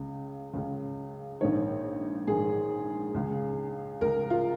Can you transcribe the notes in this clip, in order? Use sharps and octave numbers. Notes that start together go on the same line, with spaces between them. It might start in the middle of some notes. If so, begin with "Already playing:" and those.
Already playing: C#2 C#3
C#2 C#3
A#1 G#2 D#3 C#5
A#1 G#2 D#3 G#4
C#2 C#3
C#2 C#3 A#4
F4